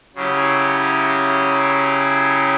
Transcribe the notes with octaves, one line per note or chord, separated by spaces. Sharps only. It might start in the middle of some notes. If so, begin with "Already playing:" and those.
C#3 F#3 C#4 E4 G4